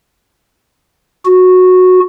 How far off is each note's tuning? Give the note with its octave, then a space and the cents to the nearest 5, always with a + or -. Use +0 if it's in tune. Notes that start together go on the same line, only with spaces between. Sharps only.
F#4 -10